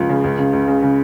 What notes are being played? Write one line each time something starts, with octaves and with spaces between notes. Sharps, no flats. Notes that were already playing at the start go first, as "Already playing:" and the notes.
Already playing: C#2 F3 F4
C#3
C#2
C#3
C#2
C#3
C#3